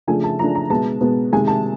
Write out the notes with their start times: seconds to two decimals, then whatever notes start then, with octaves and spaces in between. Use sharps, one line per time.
0.07 C#3 F3 A3 D4 G#5
0.24 A5
0.39 C#3 F3 A3 D4 A#5
0.55 A#5
0.70 B2 G#3 B3 A5
1.01 B2 G#3 B3
1.32 C3 D#3 G#3 G#5
1.47 A5